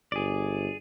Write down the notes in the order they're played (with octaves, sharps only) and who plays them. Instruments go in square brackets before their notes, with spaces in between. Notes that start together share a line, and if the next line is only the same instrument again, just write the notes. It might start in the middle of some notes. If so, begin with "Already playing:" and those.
[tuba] G1 [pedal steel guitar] G#4 D5